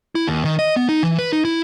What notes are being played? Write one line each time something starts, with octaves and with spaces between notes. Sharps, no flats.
E4
D#2
D#3
D#5
B3
D#4
E3
B4
D#4
E4